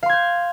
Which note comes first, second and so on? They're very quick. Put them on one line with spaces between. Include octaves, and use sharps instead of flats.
F5 C6 G#6 G6